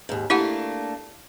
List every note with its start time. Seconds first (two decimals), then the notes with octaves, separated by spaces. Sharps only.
0.09 D#2 G#2
0.30 A3 A#3 D4 E4 G4 F#5